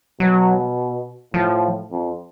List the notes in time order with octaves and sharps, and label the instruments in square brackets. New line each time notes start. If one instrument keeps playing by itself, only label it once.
[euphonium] B2 [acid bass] F#3
[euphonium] A2 [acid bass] F3
[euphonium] F2